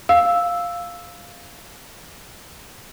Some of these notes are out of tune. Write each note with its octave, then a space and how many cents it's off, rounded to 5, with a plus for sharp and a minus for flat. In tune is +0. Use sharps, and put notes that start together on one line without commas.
F5 +0 E6 +0